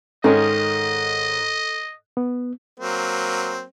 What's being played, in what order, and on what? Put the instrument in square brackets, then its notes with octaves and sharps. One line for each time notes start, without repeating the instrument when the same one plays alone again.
[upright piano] G#2 [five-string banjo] D#3 G#3 C#4 [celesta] A4 [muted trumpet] D#5
[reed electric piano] B3
[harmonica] F#3 A#3 C4